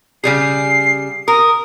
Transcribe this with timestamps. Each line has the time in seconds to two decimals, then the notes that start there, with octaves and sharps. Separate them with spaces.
0.24 C#3 G3 G#4 C7
1.28 A#4 D#6